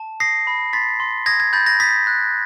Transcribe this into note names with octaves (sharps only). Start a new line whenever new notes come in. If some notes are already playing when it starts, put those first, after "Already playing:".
Already playing: A5
D#6 A#6 C7
B5
C6 A6 B6
C6
D#6 G#6 A#6
G#6
B5 G6 A6
G#6 A#6
D#6 A6 B6
F#6